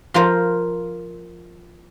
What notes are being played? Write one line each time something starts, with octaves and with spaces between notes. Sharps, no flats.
F3 F4 A#4 C5